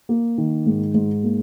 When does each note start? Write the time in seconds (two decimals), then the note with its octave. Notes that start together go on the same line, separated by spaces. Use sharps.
0.09 A#3
0.38 D#3
0.66 G#2
0.94 G#2
1.23 A#3